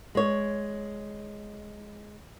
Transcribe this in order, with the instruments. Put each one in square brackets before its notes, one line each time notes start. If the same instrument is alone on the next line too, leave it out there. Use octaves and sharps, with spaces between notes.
[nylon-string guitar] G#3 C#5